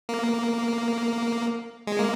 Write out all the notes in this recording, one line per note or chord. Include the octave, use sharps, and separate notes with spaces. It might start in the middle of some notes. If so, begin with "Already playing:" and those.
A#3
G#3
A#3